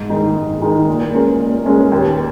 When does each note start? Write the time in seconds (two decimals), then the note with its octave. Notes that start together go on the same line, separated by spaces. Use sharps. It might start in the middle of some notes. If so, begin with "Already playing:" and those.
Already playing: G#2
0.10 D#3 G#3 D#4
0.36 G#2
0.61 D#3 G#3 D#4
0.87 A#2
1.13 G#3 C#4 A#4
1.39 A#2
1.66 G#3 C#4 A#4
1.92 D#2